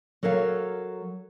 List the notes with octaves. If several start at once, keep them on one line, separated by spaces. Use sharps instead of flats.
F#3 A4 A#4 C#5 F5